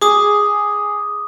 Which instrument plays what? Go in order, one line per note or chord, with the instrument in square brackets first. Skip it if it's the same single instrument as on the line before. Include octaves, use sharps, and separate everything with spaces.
[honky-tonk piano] G#4 [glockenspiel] D6 D#6